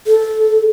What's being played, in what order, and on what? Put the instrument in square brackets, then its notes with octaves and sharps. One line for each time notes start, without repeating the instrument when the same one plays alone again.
[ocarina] A4